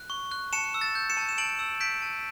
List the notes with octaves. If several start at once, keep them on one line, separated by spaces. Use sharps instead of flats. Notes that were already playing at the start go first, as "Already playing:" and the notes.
Already playing: F#6
C#6
F#6
A5 C#7 E7
E6
A6
G6
C#7 E7
A5
E7
A5 D7 F#7
E6
G6 B6 D7
A5